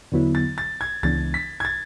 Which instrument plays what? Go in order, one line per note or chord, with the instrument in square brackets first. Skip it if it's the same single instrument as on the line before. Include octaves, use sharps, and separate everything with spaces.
[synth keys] E2 D3 F#3 B3 E4
[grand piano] A6
A6
G#6
[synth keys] C#2 C#3 E3 B3 D4 [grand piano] A6
[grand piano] B6
G#6
A6